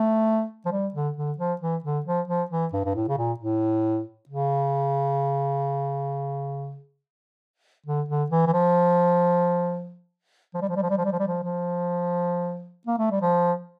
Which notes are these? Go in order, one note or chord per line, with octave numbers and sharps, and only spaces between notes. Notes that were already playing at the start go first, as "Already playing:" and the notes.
Already playing: A3
F3
G3
D3
D3
F3
E3
D3
F3
F3
E3
G2
G2
A2
C#3
A#2
A2
C#3
D3
D3
E3
E3
F3
F3
G3
F3
G3
F3
G3
F3
G3
F3
G3
F3
F3
A#3
A3
G3
F3